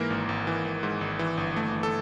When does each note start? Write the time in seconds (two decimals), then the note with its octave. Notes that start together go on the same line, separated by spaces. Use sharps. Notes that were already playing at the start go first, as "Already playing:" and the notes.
Already playing: G#2 E3 A#3 A#4
0.10 G#1
0.29 G#1
0.47 E3
0.65 G#1
0.83 G#2
1.01 G#1
1.19 E3
1.37 G1
1.56 A3
1.75 E3
1.83 A4